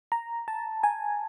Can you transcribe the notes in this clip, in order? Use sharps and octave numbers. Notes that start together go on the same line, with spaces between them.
A#5
A5
G#5